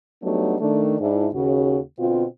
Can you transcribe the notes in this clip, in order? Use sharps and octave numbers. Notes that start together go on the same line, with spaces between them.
F#3 G3 A3 B3 D4 D#4
D#3 A3 D4
G#2 D4 E4
D#2 C#3 F#4
B2 D3 C4 F4